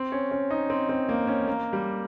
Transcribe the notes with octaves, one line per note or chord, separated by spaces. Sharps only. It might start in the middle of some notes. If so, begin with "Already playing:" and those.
Already playing: C4
C#4
C#4
D#4
C4
C4
A#3
C#4
A#3
G3